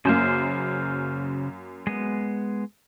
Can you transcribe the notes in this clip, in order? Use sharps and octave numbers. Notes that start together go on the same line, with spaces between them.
F#2 C#3 A#3 C5 F5
G#3 B3